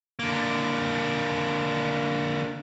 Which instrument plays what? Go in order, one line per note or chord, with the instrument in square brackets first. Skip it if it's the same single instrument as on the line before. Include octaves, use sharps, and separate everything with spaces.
[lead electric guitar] D3 A#3